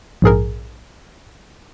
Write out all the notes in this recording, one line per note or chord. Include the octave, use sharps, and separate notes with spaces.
A#1 G#2 G#4 A#4